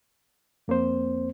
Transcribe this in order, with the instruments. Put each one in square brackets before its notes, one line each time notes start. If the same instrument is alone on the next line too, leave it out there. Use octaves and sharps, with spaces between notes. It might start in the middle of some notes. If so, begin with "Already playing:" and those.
[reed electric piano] F2 A#3 C4 C5